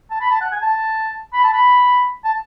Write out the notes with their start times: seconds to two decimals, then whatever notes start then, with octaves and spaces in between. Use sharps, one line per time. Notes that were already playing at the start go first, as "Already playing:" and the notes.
0.10 A5
0.21 B5
0.31 A5
0.41 F#5
0.51 G#5
0.62 A5
1.33 B5
1.43 A5
1.53 B5
2.24 A5